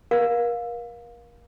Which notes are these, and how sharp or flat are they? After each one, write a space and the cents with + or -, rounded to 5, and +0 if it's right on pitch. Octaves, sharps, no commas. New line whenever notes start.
A#4 +35 F5 +15